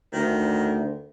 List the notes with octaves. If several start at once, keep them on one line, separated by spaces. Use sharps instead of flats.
D2 D#3